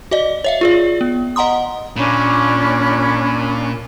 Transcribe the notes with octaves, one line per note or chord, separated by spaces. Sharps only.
F#4 D5 D#5
C#5 E5 F5
F4 G#4 D5
B3
D#5 F#5 A#5 C6 D#6
A#2 C#4 D4 B5